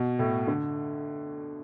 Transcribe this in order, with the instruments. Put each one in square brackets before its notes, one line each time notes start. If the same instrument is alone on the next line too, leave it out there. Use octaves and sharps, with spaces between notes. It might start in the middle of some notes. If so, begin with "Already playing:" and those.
Already playing: [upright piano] B2
A2
D3